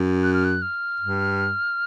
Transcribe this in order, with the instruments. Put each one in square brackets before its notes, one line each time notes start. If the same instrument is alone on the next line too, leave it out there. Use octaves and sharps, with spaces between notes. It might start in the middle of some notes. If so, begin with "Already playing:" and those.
Already playing: [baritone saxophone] F#2
[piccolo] F#6
F6
F#6
F6
[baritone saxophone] G2